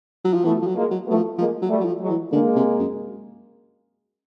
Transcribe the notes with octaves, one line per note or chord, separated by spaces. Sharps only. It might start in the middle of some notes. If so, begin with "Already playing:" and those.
F#3
F3
E3 A3 B3
F3
F#3
G#3 A#3
F#3
F#3 A3 B3
F3
F3 G#3 A#3
F#3
G3 A3
F#3
F3
F#3 G#3
E3
D3 G#3 A#3
C3
F#2